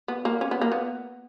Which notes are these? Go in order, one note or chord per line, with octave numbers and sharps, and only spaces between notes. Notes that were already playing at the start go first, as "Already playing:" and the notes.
B3
A#3
C#4
B3
A#3
B3